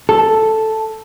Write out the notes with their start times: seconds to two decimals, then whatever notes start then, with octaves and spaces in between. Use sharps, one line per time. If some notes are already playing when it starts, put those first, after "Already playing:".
0.09 A4